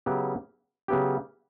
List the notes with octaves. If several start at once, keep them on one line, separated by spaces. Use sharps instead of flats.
C#3 F#3 B3 E4 G4
C#3 F#3 B3 E4 G4